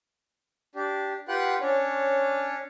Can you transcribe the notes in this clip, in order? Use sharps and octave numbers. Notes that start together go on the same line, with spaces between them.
D4 G4
F4 G4 B4 F#5 G5 F#6
C#4 D4 C#5